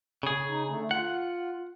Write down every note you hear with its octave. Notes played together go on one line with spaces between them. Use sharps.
C#3 G#4
D#4
D3 A3
F4 F#5